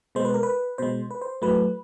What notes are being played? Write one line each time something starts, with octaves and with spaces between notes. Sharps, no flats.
B2 G#3 C5
B4
A#4
B4
B2 G#3 C5
B4
C5
A2 F#3 A3 B4